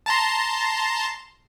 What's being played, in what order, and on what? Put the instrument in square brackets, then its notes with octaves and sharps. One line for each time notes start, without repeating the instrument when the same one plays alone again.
[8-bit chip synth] A5 A#5 C6